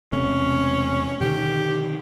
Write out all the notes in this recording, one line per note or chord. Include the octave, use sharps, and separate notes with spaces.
E1 C3 A3 C#4
B2 D3 D#3 G4